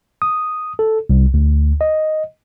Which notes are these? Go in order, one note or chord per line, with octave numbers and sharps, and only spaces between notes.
D#6
A4
C2
D2
D#5